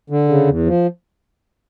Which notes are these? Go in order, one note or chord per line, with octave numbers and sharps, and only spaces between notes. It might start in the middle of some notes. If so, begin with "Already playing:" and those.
D3
C#3
E2
F3